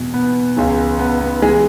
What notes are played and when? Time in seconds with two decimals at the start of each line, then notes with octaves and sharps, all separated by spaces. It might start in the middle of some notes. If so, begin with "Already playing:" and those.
Already playing: E2 B2
0.14 B3
0.57 C#2 C#3 E3
0.99 B3
1.21 B3
1.42 E3 G#3